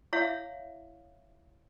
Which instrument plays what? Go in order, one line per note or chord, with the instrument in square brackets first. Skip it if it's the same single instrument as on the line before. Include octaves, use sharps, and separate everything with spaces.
[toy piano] E4 C#5 E5 F5